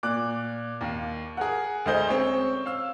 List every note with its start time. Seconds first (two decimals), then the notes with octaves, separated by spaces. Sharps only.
0.03 A#2 D6 F#6
0.81 D#2 F5
1.37 G#4 A#4 F#5
1.86 D2 G#3 C5 D#5 G6 G7
2.09 C4 C#4 C#5
2.66 F5 E6